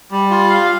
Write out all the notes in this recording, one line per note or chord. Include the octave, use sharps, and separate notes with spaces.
G3
F4
F5